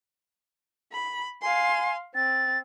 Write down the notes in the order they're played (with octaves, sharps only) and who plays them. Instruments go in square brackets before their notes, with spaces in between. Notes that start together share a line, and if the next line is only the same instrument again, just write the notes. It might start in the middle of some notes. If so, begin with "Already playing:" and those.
[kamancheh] B5
[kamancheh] F5 C6 [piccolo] G#5
[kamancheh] C4 [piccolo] A6